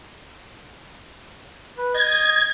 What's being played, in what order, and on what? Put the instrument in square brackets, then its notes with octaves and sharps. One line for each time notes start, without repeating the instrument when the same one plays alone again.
[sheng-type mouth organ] B4
[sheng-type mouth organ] D#5 D#6 G6 [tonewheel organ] G#6